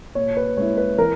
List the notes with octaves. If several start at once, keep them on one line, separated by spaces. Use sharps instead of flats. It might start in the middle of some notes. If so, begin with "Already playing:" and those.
A#2 C#5
B4
G#3 C#4 E4 C#5
B4
E3 A#4